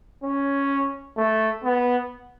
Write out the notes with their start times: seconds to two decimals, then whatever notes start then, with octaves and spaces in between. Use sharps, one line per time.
0.24 C#4
1.17 A3
1.64 B3